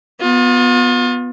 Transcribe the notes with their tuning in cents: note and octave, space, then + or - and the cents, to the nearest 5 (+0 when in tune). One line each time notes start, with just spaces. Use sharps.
B3 +0 F4 +35